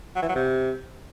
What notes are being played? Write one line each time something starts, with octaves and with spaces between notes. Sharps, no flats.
F#3
E3
F#3
C3